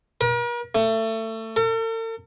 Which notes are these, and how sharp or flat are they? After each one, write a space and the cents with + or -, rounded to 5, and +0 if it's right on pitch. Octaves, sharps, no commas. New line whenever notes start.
A#4 +45
A3 +25
A4 +45